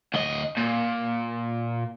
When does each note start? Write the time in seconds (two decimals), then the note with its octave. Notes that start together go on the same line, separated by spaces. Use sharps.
0.14 D2 D#5
0.57 A#2